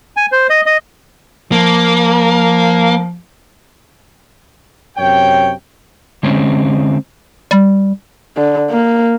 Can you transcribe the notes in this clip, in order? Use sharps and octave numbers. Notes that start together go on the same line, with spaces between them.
G#5
C5
D#5
D#5
F3 A#3
F#2 C3 C#5 G5
D3 G#3 C4 C#4
G3
D3
A#3